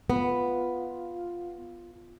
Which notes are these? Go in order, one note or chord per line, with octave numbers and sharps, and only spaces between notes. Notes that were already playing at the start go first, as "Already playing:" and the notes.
B3 F4